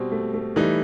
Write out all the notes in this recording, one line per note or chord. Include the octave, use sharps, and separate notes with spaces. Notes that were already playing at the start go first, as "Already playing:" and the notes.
Already playing: B2 G3 C4
A3
A3
E3 G3 A3 D#4